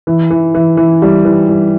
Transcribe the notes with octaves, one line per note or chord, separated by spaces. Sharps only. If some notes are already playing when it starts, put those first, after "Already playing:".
E3
E3
E3
E3
G3
E3
G3